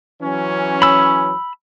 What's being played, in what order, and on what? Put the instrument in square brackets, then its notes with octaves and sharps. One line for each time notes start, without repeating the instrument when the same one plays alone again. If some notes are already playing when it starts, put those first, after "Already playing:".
[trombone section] E3 F#3 C#4
[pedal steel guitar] B5 E6